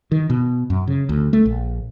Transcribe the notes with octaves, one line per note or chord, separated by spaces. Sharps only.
D#3
B2
F#2
C#3
D2
A3
A#1